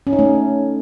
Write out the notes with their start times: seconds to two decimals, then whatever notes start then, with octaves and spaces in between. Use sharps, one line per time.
0.07 C#4
0.13 D#4
0.19 A3